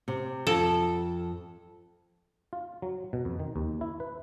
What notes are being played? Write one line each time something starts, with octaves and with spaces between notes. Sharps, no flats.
C3
F2 A4
F4
F#3
B2
F2
D#3
D#2
E4
B4